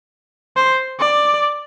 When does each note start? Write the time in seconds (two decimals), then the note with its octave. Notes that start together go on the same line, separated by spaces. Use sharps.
0.57 C5
0.99 D5